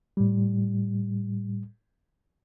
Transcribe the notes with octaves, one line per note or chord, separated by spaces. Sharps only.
A2 G3